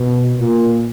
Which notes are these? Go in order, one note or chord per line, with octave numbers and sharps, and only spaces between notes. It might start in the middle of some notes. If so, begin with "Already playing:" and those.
Already playing: B2
A#2